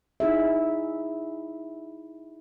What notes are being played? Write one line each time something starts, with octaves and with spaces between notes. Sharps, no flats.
D#4 E4 G#4 E5